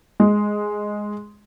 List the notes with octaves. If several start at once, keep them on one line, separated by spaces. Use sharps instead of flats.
G#3